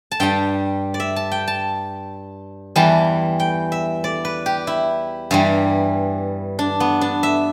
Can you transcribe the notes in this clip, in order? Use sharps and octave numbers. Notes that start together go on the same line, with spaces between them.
A5
G2 G3 G5
D5
E5
A5
G5
A5
E2 E3 G3 A5
G5
E5
D5
B4
G4
E4
G2 E3 G3
D4
B3
D4
E5